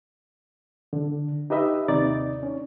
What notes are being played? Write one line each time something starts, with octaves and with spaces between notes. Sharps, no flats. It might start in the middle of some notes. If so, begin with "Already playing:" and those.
D3
D#4 G4 B4 D#5 E5
D#2 C3 D#4 D5 A6
C#4